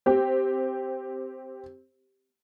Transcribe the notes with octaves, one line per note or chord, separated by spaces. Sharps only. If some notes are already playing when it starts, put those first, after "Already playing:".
C4 G4